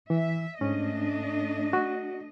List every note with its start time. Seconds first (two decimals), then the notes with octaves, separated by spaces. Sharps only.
0.10 E3 E5
0.61 G#2 A3 C#4 D4 D#5
1.73 F#4